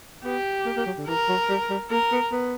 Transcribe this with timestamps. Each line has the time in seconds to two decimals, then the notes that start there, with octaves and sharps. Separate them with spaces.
0.24 B3 G4
0.66 A#3
0.77 A#3
0.86 F#3
0.98 D3
1.07 E3 A#4
1.28 F#3
1.49 G3
1.70 G3
1.90 A#3 A#4
2.12 B3
2.32 B3